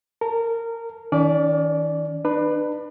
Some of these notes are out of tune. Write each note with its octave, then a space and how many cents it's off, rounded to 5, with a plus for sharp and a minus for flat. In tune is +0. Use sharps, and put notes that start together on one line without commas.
A#4 -20 A5 +0
D#3 +40 C#4 +40 D5 +0
D4 +35 B4 +0 B5 +0